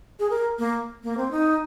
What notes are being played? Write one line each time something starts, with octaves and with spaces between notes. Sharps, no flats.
G#4
A#4
A#3
A#3
C4
D#4